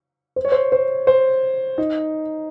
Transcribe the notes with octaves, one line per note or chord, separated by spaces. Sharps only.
C5
C#5
C5
C5
C5
D#4